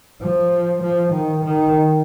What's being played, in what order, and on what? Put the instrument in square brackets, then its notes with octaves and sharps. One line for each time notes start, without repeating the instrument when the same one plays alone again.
[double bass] F3
F3
D#3
D#3